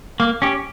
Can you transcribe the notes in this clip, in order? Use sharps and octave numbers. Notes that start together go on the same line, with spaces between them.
A#3
C#4 G4